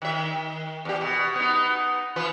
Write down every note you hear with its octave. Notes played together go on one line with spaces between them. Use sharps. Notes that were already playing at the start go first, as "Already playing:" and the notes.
D#3 E5
E2 G4
B2
B3 D#4
E3 F4 B4